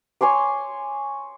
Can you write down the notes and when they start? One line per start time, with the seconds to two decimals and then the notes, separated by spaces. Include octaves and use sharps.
0.21 C#5 G#5 C6 D6